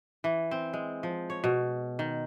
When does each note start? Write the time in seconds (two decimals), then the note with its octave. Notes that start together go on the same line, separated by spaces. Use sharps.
0.24 E3
0.51 C4
0.73 G#3
1.03 F3
1.30 C#5
1.44 B2
1.99 D#3